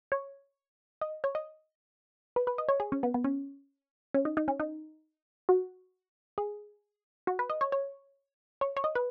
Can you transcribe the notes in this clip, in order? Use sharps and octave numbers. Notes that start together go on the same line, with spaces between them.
C#5
D#5
C#5
D#5
B4
B4
D#5
C#5
G#4
C#4
B3
B3
C#4
C#4
D#4
D#4
C#4
D#4
F#4
G#4
F#4
B4
D#5
C#5
C#5
C#5
C#5
D#5
B4